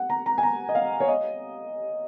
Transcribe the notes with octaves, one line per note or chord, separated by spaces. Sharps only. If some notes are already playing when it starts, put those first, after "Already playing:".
Already playing: F#5
A#5
A#5
G#5
A#5
D#5
F5
C#5
D#5